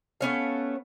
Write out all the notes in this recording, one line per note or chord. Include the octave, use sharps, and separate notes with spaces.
A3 B3 C#4 F5